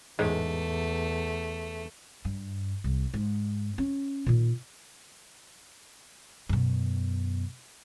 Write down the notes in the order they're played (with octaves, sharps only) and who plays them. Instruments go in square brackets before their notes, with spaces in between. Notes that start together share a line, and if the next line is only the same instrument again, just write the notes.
[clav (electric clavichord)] A1 G#2 G#3 [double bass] E2 [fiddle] A3
[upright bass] G2
C2
G#2
C#4
A#2 D#3
F#2 B2